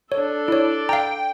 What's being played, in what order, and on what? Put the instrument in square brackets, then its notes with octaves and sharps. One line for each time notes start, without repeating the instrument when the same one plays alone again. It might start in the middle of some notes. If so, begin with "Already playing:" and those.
[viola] D4 A4 [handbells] C#5
[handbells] E4 C#5 [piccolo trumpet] D5
[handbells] F5 A#5 [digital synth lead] G5